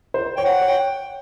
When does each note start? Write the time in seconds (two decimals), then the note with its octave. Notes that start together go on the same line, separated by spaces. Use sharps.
0.14 C5
0.36 C#5 G5
0.45 F#5
0.61 C#5
0.68 G5